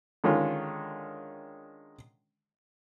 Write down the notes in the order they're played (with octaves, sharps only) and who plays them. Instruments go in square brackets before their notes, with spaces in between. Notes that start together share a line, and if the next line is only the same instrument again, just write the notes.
[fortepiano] D3 D#3 G#3 C#4 F4